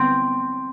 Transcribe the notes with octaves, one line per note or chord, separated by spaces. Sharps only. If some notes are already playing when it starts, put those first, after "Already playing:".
Already playing: C4